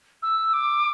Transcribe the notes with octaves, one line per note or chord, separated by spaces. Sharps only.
E6
D6